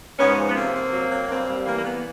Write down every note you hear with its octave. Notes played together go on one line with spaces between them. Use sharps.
G#2 B3 C#4
F3
B3
C3 A#3 C4
C3
F#3
F#3
G2 A#3 C4
G3
E3 A#3
A#3
E3 B3